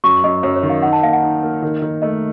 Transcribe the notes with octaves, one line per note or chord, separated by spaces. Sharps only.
F#2 C#6
F#2 D#5
F#2 C#5
C#5
D#3
F5
D#4 F#5
A5
A#3 F5
F#5
D#4
A#3
D#3
D#3
A3 D#5